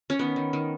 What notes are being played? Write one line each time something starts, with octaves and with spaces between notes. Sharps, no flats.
C#4
D#3 B3
D#3
D#3